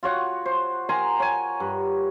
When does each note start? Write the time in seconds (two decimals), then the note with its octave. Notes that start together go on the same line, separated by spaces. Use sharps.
0.03 F4 F#4 C#5 F#5
0.45 C5
0.89 A#4 G#5 A#5 C6
1.20 C#5 G#5
1.60 G2